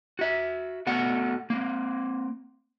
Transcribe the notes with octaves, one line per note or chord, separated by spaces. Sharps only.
F#4 E5
A3 B3 F#4 F#5
A#3 C4